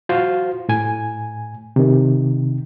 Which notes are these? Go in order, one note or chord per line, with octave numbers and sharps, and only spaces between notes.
F4 F#4 C5 F5
A2 G#5
C3 D#3